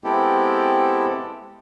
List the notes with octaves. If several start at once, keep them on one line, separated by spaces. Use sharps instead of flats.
G#3 B3 C4 E4 G4 A4